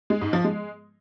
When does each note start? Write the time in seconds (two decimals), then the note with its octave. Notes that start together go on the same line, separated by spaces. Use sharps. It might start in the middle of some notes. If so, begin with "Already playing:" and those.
0.10 G#3
0.22 G#2
0.33 F3
0.44 G#3